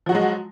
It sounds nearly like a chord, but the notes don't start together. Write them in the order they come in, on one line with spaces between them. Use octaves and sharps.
F3 F#4 F#3 G#3